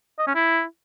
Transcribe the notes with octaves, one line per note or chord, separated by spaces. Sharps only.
D#5
C#4
E4